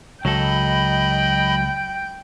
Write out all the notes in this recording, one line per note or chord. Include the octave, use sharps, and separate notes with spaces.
C#2 F#3 A4 D#5 G5 B5